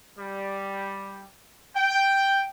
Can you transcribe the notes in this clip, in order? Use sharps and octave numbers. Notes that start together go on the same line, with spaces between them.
G3
G5